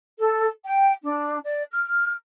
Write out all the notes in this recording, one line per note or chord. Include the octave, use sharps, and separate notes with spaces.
A4
G5
D4
D5
F6